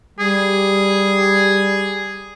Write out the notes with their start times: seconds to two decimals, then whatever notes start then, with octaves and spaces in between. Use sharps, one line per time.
0.19 G3 G#4